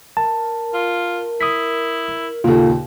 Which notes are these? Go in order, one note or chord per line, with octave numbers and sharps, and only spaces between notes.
A#4 A5
F4
E4 D#6 B6
D#2 A#2 C#3 F4 A4